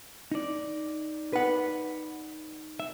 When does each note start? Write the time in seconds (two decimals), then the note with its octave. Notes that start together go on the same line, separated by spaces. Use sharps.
0.31 D#4 D5
1.33 B4 F#5
2.80 E5